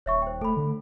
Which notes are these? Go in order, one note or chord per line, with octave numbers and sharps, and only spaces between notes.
D#1 C#5 E5 C#6
C5 G5
A3 A4 B5
D3